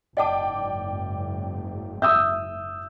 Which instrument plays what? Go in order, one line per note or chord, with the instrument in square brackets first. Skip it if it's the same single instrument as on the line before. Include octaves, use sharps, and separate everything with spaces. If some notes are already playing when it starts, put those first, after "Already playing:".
[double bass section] F#1 G#2 [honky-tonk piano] D5 G5 D6 [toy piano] D#5 F#5 A5
[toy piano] E5 [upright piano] D#6 E6 G6